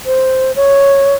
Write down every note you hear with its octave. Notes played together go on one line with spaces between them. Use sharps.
C5
C#5